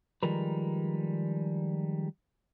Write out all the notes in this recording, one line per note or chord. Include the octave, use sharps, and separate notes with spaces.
D#3 F3 G3 G#3 A#4 B4